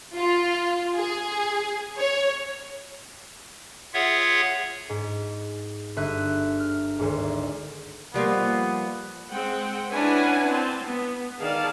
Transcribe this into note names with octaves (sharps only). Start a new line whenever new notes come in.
F4
G#4
C#5
F4 G#4 C#5 E5 F#5
G#2
G1 E5 F#6 D#7
F6
G#1 D2 G#2
F3 G3 A#3 B3
G#3 C4 F#5 G5
C#4 D4 E4 B4 F#5 G#5
C4 A5
B3
D#3 G#4 D5 F5 A5